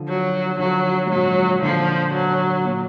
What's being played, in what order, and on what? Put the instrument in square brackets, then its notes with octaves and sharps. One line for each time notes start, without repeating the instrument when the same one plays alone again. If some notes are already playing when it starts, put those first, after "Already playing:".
Already playing: [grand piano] D3 F3
[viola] F#3
[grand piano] D3 F3 [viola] F#3
[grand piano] G#2
[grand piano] A#2 [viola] F#3
[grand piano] A#2 D3 [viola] F3
[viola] F#3
[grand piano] A#2